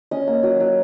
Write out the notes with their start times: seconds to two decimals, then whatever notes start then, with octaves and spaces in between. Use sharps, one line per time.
0.11 C#4 D#5
0.27 A#3
0.43 F#3
0.60 F#3